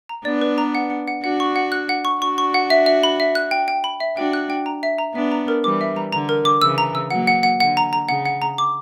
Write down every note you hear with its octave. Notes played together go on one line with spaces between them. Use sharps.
A#5
B3 D4 D5
B4
A#5
F#5
F#5
F#5
D4 F#4 F#5
C#6
F#5
F#6
F#5
C#6
D4 F#4 C#6
C#6
F#5
E5
E5
B5
E5
F#6
G5
G5
B5
E5
D4 F#4 G5
F#6
G5
A#5
E5
A#5
B3 D4 E5
A#5
A#4
E3 G3 D6
E5
A#5
D3 A#5
A#4
D6
C#3 E3 E6
A#5
E6
F#3 A#3 F#5
F#5
F#5
D3 F#5
A#5
A#5
C#3 F#5
F#5
A#5
D6